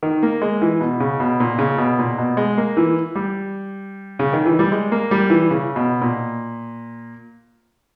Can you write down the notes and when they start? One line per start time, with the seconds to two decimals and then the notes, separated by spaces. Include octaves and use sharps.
0.03 D#3
0.23 A#3
0.42 G#3
0.62 E3
0.81 B2
1.00 C#3
1.20 B2
1.40 A#2
1.59 C#3
1.78 B2
1.99 A#2
2.18 B2
2.37 G#3
2.57 A#3
2.77 E3
3.15 G3
4.19 C#3
4.33 D#3
4.46 E3
4.59 G3
4.72 G#3
4.92 A#3
5.11 G3
5.30 E3
5.51 C#3
5.76 B2
6.02 A#2